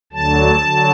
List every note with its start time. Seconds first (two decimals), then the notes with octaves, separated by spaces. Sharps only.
0.12 D2 D3 F#3 A5
0.61 D3 F#3